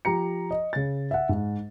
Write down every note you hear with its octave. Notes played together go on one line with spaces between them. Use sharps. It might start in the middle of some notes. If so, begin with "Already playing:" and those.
F3 G4 A#5 C#7
D#5
C#3 A6
E5 F#5
G#2